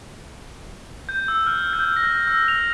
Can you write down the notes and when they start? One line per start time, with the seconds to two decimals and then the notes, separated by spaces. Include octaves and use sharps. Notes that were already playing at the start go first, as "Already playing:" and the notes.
1.09 G6
1.28 E6
1.46 F6
1.73 G6
1.96 A#6
2.27 E6
2.48 F7